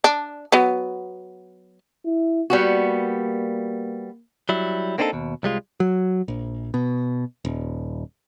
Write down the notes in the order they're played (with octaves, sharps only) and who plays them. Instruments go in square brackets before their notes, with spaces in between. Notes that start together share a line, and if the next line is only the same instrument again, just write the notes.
[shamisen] D4
F#3 B3
[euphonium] E4
[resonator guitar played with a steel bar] G3 B3 F#4 [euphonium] A#3
[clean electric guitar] F#3 G3 E4
A#3 C4 D4 D#4 F#4 A4
D#2 B2
C2 G3 G#3 F4
[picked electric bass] F#3
A#1
B2
D#1